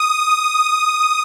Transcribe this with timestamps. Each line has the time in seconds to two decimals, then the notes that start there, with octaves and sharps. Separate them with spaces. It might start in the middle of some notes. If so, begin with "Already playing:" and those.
Already playing: D#6